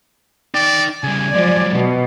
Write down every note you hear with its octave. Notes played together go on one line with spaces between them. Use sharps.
D#4 D5 G5
C#3 G3 G#5
F3 F#3 G#3 D5
B2